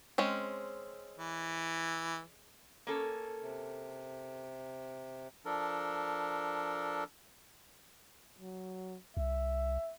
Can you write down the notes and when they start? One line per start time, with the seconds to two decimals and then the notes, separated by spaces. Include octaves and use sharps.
0.18 G#3 C4 C#4
1.18 E3
2.87 A#3 C#4 A4
3.42 C3
5.45 F3 D4 A4 A#4
8.39 F#3
9.17 C2 E5